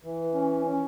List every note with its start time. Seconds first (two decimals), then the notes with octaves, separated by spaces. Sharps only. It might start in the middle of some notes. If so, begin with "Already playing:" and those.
0.04 E3
0.34 C#4
0.65 C#4